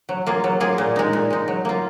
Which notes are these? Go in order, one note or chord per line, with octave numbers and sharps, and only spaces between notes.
F#3
A#3 F4 G#4
F#3
A#3 F4 G#4
A#2
G#3 D#4
A#2
G#3 D#4
F#3
A#3 F4